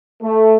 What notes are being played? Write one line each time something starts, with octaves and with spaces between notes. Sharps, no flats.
A3